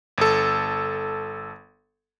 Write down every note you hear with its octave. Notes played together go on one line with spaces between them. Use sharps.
G1 A4